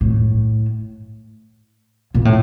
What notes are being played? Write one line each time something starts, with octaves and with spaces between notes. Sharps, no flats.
A2
A#2
A2